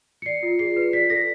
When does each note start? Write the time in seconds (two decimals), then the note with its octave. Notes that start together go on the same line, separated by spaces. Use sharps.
0.22 C#7
0.26 D5 C7
0.43 F4
0.59 G#4 C7
0.77 B4
0.93 D5 B6
1.10 A4 A#6